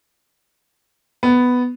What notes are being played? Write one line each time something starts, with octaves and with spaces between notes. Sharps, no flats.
B3